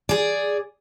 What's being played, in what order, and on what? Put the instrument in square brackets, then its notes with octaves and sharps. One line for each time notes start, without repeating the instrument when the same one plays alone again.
[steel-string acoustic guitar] G#4 D5